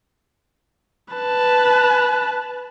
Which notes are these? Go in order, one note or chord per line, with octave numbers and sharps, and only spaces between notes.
B4 A5